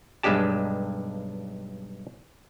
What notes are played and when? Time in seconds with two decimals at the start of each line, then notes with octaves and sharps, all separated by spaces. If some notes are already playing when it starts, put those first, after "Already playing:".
0.23 B1 G2 G#3 D4 G4 A5